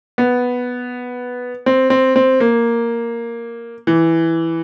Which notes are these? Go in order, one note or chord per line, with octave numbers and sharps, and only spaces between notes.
B3
C4
C4
C4
A#3
E3